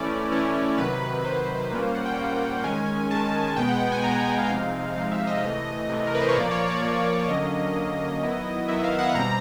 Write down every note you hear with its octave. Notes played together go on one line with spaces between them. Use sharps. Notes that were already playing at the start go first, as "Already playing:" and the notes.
Already playing: E3 A3 C#4 E4 D5
E3 A3 C#4 E4
C3 D#3 F#3 B4
C3 D#3 F#3 C5
B4
C5
A#2 G3 A#3 C#4 F4 B4
C5
F#5
G5
A#2 G3 A#3 C#4 F4
D#3 G#3 C#4 G#5
D#3 G#3 C#4 A5
B2 G#3 B3 G5
F#5
G5
G#5
B2 G#3 B3 A#5
G#5
F#5
F5
C3 F3 G#3 C4 D#4 F5
C3 F3 G#3 C4 D#4 F5
E5
D#5
C3 E3 A3
C3 E3 A3
A#4
B4
C5
C#5
A#2 F3 A#3 D5
C#5
D5
A#2 F3 A#3
D5
D3 F#3 A#3 C#4 D#5
D3 F#3 A#3 C#4
D#3 F#3 B3 E4
D#3 F#3 B3 E4 E5
F5
F#5
B2 G3 C4 A#5